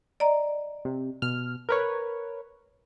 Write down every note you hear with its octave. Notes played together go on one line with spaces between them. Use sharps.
D5 D#5 A#5
C3
B2 F6
A#4 B4 C#5